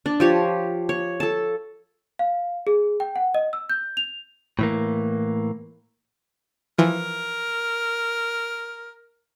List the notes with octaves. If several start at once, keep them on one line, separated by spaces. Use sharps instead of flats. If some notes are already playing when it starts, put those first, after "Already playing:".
D4
F3 G4 C#5
C#5
A4 A5
F5
G#4
G5
F#5
D#5
E6
G6
F7
A2 E3 A#3
E3 F3 A#4